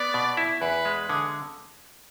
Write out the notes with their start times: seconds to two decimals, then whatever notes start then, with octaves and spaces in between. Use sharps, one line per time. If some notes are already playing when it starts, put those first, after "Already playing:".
Already playing: B3 D5
0.14 B2
0.37 E4
0.61 E2 B4
0.85 G#3
1.09 D3 G#4